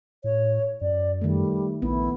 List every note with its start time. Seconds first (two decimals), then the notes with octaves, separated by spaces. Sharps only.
0.24 A2 C#5
0.81 F#2 D5
1.21 D#3 G3 A3
1.82 A#1 B3 E4